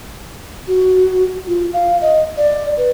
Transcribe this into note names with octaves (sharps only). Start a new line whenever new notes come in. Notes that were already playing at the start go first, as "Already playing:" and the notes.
F#4
F4
F5
D#5
D5
B4